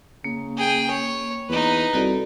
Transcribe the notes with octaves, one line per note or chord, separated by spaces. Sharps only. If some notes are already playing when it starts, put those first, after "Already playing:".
C#3 A#3
G#4 G5
C#5
E2 D#4 B4
C2 F#4 A4 D5